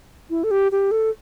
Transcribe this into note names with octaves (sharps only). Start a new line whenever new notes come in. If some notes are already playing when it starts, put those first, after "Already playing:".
E4
A4
G4
G4
A4